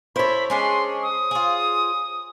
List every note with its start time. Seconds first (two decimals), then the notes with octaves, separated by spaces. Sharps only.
0.16 E4 A4 C5 C#5 B5
0.50 G#3 C#4 D4 C6
1.02 D#6
1.31 F4 G#4